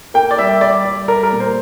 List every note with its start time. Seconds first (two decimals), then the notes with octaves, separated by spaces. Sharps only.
0.14 A#3 G5
0.31 D5
0.38 G3 E5
0.61 G3 D5
0.85 G3
1.08 G3 A#4
1.23 A#4
1.32 A#2
1.40 C5